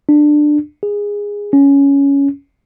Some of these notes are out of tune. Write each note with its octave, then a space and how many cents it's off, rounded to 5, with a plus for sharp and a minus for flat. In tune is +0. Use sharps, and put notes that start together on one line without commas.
D4 +15
G#4 -15
C#4 +10